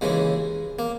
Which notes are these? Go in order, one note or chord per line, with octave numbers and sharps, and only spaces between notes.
D#2 C#3 E3 G#3
A#3